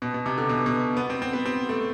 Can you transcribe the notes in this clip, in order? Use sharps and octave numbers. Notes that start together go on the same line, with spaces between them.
B2
B2
C3
D3
B2
B2
B3
C4
C4
B3
C4
A3